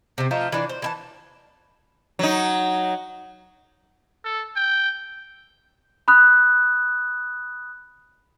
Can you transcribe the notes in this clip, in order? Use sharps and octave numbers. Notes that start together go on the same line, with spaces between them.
C3 C4
F3 A3 D#4 F4
E3 D4 D5
C5
E3 C5 A5
F#3 D#4
A4
G5
B5 D#6 F#6